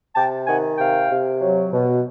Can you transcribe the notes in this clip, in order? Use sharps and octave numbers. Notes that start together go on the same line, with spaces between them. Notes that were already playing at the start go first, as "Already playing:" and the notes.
C3 G5 A5
D#3 F#5 G#5
C3 F5 G5
C3
F#3
B2